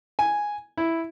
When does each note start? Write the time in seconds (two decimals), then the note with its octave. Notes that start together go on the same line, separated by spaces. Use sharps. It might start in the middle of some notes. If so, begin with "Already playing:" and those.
0.19 G#5
0.77 E4